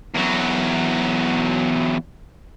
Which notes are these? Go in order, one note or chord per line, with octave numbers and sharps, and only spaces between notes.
E2 F#3